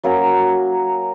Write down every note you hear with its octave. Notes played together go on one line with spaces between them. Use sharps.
F#3 A#3 C#4 A#4